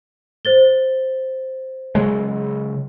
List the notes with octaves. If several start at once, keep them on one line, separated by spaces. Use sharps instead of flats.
C5 A6 G7
C#3 F#3 G#3